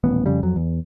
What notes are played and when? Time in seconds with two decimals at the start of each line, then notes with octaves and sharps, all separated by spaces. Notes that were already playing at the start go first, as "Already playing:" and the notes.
0.04 D#1 A1 B3
0.26 F2 C#3 G3
0.43 F2 F#3
0.56 E2